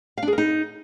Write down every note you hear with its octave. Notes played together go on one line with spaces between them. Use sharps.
F5
D4
G#4
A#4
D#4